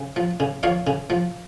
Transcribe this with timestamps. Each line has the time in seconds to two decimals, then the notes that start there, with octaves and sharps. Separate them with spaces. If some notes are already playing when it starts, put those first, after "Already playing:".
Already playing: C#3
0.16 F3
0.40 C#3
0.63 F3 C#5 F5
0.87 C#3
1.10 F3